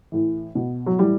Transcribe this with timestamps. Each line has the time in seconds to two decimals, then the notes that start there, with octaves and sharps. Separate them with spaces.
0.12 A2 E3
0.55 B2
0.86 F#3
0.98 A2 E3 G3